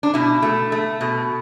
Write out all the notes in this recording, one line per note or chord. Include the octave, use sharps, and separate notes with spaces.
D4
B2 E4
A3
A3
B2